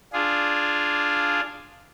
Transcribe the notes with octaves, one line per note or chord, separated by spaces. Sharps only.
D4 F4 G#4